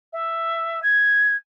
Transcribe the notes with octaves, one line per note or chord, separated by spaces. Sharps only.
E5
G#6